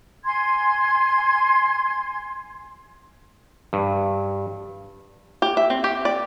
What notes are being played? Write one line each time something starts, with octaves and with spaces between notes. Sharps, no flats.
G#5 C6 G#6
G2
G4
E5
C4
G4
D5